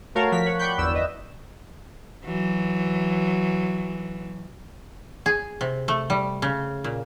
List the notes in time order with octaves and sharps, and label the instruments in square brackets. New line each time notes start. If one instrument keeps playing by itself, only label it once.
[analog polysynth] A3 F#4 A#4 C#5 F5 A5
F3 F#4 A#4 B6
C#5 F#5
D5 G5 B5 C#6 F#6 G6
G1 E2 D5 E6
B4 D#5 E5
[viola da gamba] E3 F#3
[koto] G#4
C3
A3
G3
C#3
A#2